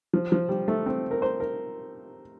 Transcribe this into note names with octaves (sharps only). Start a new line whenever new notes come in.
F3
F3
G3
A3
C4
A#4
C5
A#4